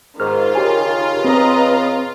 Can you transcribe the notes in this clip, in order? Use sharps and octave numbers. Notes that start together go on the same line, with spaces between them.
G#2 D#3 F4 F6
C#3 G4 G#5
C4 B4 D#5 A#5